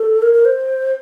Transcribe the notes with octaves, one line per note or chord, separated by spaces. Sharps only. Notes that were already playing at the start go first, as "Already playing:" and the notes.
Already playing: A4
A#4
A#4
C5